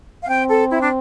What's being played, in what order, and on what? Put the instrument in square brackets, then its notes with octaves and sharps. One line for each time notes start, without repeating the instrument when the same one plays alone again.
[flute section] F5
[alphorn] C4 [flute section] G5
[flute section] A4
E4
D4